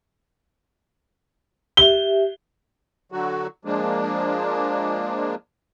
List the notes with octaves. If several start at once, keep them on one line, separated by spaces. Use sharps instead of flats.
G4 E5 G7
D3 F#3 F#4
F3 G#3 A#3 D4